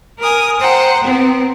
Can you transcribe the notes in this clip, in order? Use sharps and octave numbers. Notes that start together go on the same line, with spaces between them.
A#4 G#5 D#6
C5 F#5 G5 A#5
B3 C4